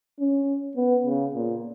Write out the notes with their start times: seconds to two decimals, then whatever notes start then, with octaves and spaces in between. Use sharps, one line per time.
0.20 C#4
0.76 B3
1.06 C#3
1.35 A#2